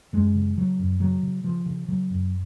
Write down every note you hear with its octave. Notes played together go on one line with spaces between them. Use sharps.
F#2 G#3
C#3
C#3 F#3
F#2
C#3 F#3
C#3
C#3 F3
C#3
C#3 F#3
F#2